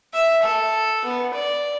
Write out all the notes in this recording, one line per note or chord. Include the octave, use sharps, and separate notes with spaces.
E5
A4
B3
D5